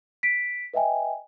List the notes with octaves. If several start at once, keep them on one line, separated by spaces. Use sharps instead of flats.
B6 D7
B4 D#5 E5 G5 G#5